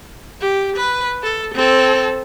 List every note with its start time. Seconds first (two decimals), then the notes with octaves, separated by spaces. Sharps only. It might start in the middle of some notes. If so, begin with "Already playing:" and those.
0.40 G4
0.76 B4
1.23 A4
1.54 C4 A4